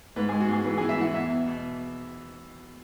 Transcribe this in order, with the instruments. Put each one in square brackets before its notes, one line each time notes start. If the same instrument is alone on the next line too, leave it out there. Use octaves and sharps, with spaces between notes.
[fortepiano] G#2 B4
G#4
G#3
F#4
G#2 G#4
E3 B4
G#4
E3
E5
E3 F#5
E2 E5
E2
B2